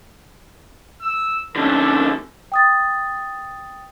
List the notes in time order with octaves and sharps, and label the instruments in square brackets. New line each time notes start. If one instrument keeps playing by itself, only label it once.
[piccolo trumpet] E6
[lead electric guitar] F2 D3 [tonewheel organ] C#4 D#4 [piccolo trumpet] A4
[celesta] G5 D#6 A6